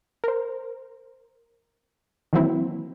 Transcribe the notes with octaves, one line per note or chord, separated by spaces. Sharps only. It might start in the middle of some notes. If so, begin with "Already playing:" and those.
A#4 C5
D#3 E3 F#3 A#3 C4 E4